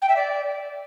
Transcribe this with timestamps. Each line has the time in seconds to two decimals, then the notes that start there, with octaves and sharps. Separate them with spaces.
0.02 G5
0.09 E5
0.16 D5